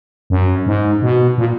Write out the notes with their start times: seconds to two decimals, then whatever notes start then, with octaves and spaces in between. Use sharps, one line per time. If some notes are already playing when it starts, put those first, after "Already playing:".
0.30 F#2
0.66 G#2
1.02 B2
1.38 A#2